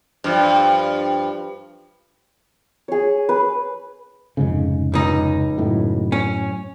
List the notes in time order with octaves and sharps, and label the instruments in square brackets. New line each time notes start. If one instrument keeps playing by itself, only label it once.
[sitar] G2 F3
[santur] G#4 C#5
B4
[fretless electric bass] F1 G#2 C#3
[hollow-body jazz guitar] C#2 D#4
[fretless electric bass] F#2 A2
[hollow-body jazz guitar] C#4